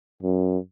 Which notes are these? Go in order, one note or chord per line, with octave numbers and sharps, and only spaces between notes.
F#2